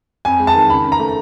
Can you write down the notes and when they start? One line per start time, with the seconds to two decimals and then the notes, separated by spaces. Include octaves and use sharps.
0.25 F2 G#5
0.40 G#3
0.47 A5
0.55 D#3
0.69 C#3 B5
0.85 C#3
0.92 A#5
0.99 A3